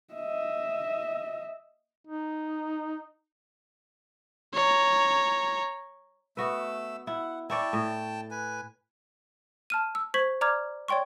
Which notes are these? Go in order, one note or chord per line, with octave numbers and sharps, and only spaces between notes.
D#5 E5
D#4
C#5 A#5
A3 B3 F#4 B4 E6
E4 F#5
E4 C#5 D5 G5 A5
A2
B4 G#5
A5 F6 D#7
E6
C5 C#6 G#6 B6 F#7
D5 A#5 D6 F6 G#6
C#5 D5 G5 C6 C#6